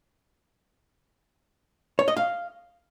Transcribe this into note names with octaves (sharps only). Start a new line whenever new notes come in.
C#5
D#5
F5